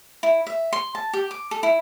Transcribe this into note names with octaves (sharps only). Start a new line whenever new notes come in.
E4
E5
C6
A5
G4
D6
A4
E4